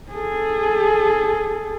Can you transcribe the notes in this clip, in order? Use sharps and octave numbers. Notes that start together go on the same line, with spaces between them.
G#4 A4